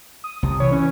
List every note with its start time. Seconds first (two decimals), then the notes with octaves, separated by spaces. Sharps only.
0.24 D#6
0.43 C2 C3
0.60 E3 C#5
0.72 C#4